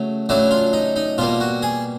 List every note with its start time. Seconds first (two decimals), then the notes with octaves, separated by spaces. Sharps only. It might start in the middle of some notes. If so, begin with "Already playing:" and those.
Already playing: C#3 F#3 A3
0.29 C#3 F#3 A3 D4 E4
0.51 F4
0.73 D#4
0.96 D#4
1.18 B2 G3 A#3 F4
1.40 F#4
1.62 G#4